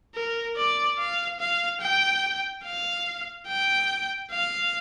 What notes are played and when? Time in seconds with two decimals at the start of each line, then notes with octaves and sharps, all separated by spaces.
0.15 A#4
0.57 D5
0.99 F5
1.40 F5
1.81 G5
2.64 F5
3.48 G5
4.31 F5